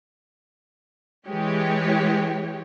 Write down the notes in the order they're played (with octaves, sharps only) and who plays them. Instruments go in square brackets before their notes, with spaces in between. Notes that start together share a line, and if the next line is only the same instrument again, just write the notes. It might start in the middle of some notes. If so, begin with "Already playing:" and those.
[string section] E3 G#3 G4 C#5